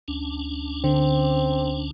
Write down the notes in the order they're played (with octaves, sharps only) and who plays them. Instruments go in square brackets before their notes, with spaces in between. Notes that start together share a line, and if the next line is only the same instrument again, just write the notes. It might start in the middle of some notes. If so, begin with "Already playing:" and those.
[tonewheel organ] D2 C#4 D4
[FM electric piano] D3 [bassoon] C4